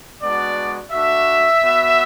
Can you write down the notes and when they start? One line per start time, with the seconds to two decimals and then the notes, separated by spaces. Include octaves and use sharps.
0.22 G#3 B3 D4 F#4 D5
0.92 A3 D4 F#4 E5
1.63 B3 F#4